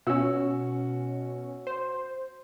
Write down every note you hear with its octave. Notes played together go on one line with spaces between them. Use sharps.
B2 C#4 F#4 E6
C5